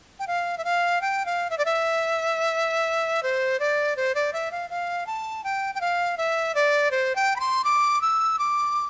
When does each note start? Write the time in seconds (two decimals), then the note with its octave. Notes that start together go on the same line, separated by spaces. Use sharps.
0.19 G5
0.27 F5
0.58 E5
0.65 F5
1.01 G5
1.26 F5
1.50 E5
1.58 D5
1.65 E5
3.23 C5
3.60 D5
3.97 C5
4.15 D5
4.33 E5
4.52 F5
4.70 F5
5.07 A5
5.44 G5
5.75 G5
5.81 F5
6.18 E5
6.55 D5
6.91 C5
7.16 G5
7.36 B5
7.40 C6
7.64 D6
8.01 E6
8.39 D6